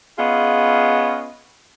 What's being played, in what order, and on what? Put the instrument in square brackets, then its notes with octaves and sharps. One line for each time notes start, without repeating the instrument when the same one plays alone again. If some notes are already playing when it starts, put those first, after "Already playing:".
[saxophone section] B3 C#4 F4 G#4 D#5